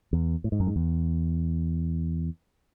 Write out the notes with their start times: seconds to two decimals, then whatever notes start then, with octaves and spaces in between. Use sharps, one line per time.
0.13 E2
0.44 A2
0.52 G#2
0.60 F#2
0.67 G#2
0.76 E2